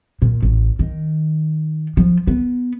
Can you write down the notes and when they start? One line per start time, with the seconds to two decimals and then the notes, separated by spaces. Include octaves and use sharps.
0.22 A#2
0.42 A1
0.79 D#3
1.97 F3
2.27 B3